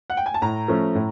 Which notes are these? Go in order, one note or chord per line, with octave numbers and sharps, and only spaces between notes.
F#5
G5
G#5
A5
A2 A#5
F3 A3 C#4
A2